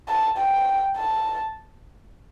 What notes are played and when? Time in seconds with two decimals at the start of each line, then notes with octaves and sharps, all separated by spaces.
0.08 A5
0.38 G5
0.97 A5